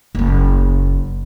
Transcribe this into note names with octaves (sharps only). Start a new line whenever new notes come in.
F#1 A#3